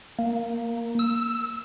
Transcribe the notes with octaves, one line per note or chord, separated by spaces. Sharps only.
A#3
E6